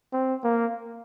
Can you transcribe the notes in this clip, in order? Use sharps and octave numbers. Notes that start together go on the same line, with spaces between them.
C4
A#3